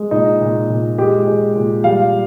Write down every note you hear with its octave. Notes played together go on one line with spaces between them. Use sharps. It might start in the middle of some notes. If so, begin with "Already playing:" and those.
Already playing: G#3
A#2 D#4
A#2
A#2
G#3 G4
G#3
A#2
G3 F5